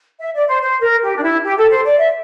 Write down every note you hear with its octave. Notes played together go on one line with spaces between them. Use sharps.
E5
D5
C5
C5
A#4
G4
D4
E4
G4
A4
C5
D5
E5